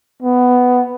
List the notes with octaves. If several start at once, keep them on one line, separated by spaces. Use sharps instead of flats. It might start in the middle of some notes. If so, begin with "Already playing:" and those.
B3